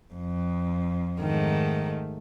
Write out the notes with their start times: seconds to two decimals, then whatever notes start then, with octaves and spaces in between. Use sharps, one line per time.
0.14 F2
1.19 G#2 D#3 A3